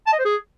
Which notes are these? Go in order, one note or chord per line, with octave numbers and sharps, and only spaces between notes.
A5
D#5
C5
G#4